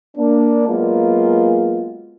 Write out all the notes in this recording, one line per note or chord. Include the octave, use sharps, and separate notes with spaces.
A#3 D4
F#3 G#3 A#3 B3 F4